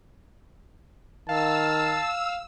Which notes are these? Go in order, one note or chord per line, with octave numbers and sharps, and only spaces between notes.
D#3 F5 A5 E6